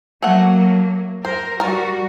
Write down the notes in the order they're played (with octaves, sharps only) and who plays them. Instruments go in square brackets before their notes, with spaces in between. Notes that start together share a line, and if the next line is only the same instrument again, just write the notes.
[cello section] F#3 A#3 [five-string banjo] A3 F#5
[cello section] A#4 [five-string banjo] C5
[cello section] G3 F#4 [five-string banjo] A#4 D5